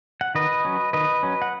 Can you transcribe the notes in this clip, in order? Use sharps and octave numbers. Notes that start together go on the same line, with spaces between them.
F#5
D#3 B4 D#5
F#3 C#4
D#3 B4 D#5
F#3 C#4
F#5